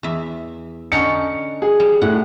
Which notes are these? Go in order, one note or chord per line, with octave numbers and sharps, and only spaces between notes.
E2 E5
D3 C#4 D#4 C#7
G#4
G3
A2 F#5